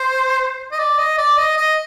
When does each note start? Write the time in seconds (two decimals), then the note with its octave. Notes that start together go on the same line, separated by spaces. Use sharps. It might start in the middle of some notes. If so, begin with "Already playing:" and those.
Already playing: C5
0.71 D#5
0.79 D5
0.98 D#5
1.18 D5
1.37 D#5
1.57 D#5